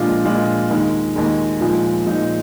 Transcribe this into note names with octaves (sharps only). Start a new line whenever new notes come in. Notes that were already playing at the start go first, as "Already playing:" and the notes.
Already playing: A#2 F3 G#3 D4 F4
A#2 F3 G#3 D4 F4
D#2 D#3 G#3
D#2 D#3 G#3
A#2 F3 G#3 D#4
A#2 F3 G#3 D#4